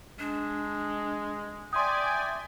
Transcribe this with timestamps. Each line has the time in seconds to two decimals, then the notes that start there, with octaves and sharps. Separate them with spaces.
0.19 G#3 D4
1.73 D5 E5 G5 G#5 C6 D#6